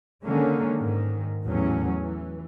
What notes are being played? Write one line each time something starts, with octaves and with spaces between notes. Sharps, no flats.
D3 D#3 G#3 A#3 C#4
G#2 D#3
A1 E2 A2 F#3 C#4
E3